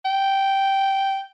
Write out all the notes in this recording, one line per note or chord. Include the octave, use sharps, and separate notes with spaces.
G5